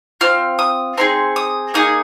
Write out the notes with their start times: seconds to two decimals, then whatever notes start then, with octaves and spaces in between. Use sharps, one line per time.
0.21 C4 F4 F6
0.59 D#6
0.98 C4 D#4 G#4 C6
1.36 D#6
1.74 A#3 D#4 G#4 D#6